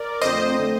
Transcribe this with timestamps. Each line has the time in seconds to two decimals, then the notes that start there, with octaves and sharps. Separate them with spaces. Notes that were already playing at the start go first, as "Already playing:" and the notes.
Already playing: A#4 D5
0.21 F2 D3 A3 C4 C5 D#5
0.58 D3 A3 C4